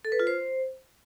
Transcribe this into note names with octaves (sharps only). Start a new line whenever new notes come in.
A4
B4
F4
C5